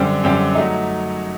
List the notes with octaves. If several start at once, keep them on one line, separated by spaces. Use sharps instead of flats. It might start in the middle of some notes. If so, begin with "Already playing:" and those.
Already playing: F#2 D3 G3 C4 G4
F#2 D3 G3 C4 G4
F#3 A3 D#4